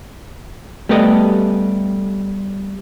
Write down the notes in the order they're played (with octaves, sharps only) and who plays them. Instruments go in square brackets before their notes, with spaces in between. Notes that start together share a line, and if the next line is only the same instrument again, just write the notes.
[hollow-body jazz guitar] G3 A3 B3 G4 A4 D#5